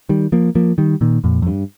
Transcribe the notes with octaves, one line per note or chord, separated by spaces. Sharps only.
D#3 G3
F3 A#3
F3 A#3
D#3 G3
A#2 D#3
F2 A#2
F2
G2